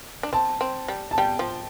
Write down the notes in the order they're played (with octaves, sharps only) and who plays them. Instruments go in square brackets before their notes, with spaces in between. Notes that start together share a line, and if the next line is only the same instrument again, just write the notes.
[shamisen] D4
[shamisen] C4 [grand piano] A5
[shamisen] C4
G3
[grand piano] A5
[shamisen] G3 [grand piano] G5
[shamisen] F3